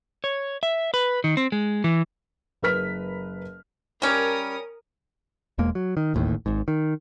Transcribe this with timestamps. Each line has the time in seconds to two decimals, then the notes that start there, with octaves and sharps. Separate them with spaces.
0.24 C#5
0.63 E5
0.94 B4
1.24 D#3
1.37 C4
1.52 G#3
1.84 E3
2.62 F#1 A#4 B4 F6 B6
4.02 G3 C#4 A#4 D#6
5.58 E1 E2 G#3 A#3
5.75 F#3
5.97 D#3
6.14 D1 A1 D#2 A2
6.46 G#1 G#2
6.68 D#3